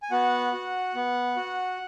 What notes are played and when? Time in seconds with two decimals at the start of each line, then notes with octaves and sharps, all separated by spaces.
0.03 G#5
0.11 B3 F#4 F#5
0.53 F#4
0.95 B3
1.36 F#4